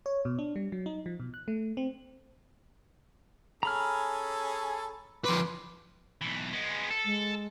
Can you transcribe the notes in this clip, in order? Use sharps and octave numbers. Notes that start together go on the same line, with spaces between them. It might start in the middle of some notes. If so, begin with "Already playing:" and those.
C#5
B2
D4
G3
F#3
D#4
F3
B2
F#6
A3
C4
C#4 G#4 A4 A#5 B5 F6
F2 B4 C6 D6
B1 E3
G#3 B3
A4
G#3